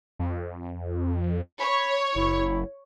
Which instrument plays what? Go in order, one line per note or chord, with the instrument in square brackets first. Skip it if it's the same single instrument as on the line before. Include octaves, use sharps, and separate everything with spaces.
[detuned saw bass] F2
[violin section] C#5 [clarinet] B5
[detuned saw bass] F#1 [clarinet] E4